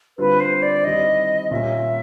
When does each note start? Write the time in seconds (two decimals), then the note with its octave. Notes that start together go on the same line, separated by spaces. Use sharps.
0.18 D3 G3 C4 F4 B4
0.40 C5
0.62 D5
0.84 D#3 G3 C4 E4 D#5
1.51 A#2 G3 A#3 C#4 E5